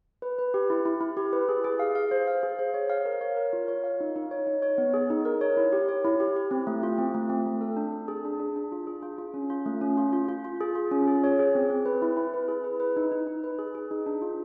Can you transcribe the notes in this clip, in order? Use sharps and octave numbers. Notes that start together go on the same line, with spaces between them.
B4
B4
G4
E4
E4
E4
G4
B4
G#4
G#4
F5
F5
C5
F5
G#4
C5
C#5
F5
A#4
C#5
A#4
F4
C#5
F5
D#4
D#4
C#5
D#4
C#5
B3
G#4
D#4
A#4
C#5
E4
G4
C#5
E4
G4
G4
C4
A3
F4
C4
A3
C4
A3
A4
D4
D4
G#4
D4
D4
D4
F4
G#4
F4
F4
C#4
F4
A3
C#4
F4
F4
F4
F4
G#4
F4
C#4
G#4
C#5
G#4
C4
C4
B4
E4
E4
B4
G#4
B4
B4
D#4
D#4
D#4
B4
G#4
G#4
D#4
D4
F4